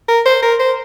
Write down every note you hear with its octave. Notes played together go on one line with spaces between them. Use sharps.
A#4
C5
A#4
C5